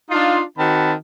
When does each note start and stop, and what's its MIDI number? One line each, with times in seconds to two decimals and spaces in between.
0.10 0.41 62
0.10 0.41 63
0.10 0.41 65
0.58 0.93 51
0.58 0.93 60
0.58 0.93 66
0.58 0.93 81
0.58 0.93 83